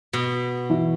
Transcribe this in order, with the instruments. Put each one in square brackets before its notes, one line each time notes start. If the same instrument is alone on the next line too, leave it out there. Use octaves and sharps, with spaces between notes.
[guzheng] B2
[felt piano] E3 E4 F#4